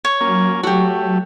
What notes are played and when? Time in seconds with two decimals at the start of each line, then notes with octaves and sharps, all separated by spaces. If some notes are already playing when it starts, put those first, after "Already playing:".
0.05 C#5
0.20 F#3 A#3 C#4
0.63 A3 F#4 G4